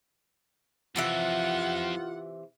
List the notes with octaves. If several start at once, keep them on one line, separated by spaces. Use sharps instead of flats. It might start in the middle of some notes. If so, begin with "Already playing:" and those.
F2 C3 E3 F4 E5 F#5